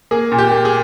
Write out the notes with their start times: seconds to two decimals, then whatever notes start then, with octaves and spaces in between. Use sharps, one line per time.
0.11 A#3 G#4
0.32 A#2
0.38 G4
0.51 A#3
0.65 G#4